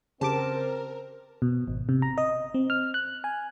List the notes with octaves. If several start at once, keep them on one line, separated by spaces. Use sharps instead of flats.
C#3 C4 G4 A#4 C5 A5 D6
B2
G#1
C3
A#5
D#5
C4
F6
F#6
G#5